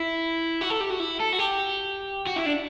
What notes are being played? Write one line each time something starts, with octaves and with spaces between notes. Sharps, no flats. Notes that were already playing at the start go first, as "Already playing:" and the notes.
Already playing: E4
F#4
A4
G4
F#4
E4
A4
F#4
G4
F#4
E4
D4